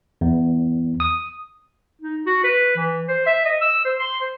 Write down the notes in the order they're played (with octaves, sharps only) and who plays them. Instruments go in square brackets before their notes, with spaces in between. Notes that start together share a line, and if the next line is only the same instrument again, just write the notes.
[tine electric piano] E2
D#6
[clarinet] D#4
F#4
B4
E3
C5
E5
D#5
E6
C5
C6
C5